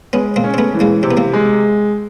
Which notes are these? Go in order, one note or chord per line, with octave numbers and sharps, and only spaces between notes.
G#3 B3 C#4
A#3 C4
C#4
C4
A3 B3
E3
G#3 A#3
C3 C4
B3
A#3 C4
G#3